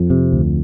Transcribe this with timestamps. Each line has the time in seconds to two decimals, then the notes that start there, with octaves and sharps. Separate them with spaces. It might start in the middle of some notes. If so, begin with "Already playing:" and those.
Already playing: F2 F3
0.10 C3
0.33 D2